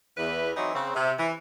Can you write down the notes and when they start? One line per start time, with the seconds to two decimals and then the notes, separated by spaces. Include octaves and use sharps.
0.17 E2 B4
0.56 E3 F#3 C4 D#4
0.75 C#3 C4
0.95 C3
1.19 E3